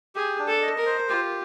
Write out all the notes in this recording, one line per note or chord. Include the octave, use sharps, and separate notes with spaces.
G4 G#4
D4
A4
D#5
A#4
C5
F4 G4